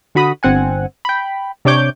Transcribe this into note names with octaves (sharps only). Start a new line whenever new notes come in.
D3 F#4 B5 D#6
G1 C4 F#5 G#5
G5 B5
C3 D4 C#5 D6 G6